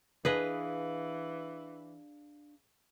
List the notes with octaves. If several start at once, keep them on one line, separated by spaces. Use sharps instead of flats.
E3 D4 G#4 B4 D#5 F5